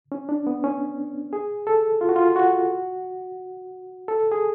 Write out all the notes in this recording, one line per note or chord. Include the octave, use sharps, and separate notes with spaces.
C#4
D4
B3
C#4
G#4
A4
F4
F#4
F4
F#4
A4
G#4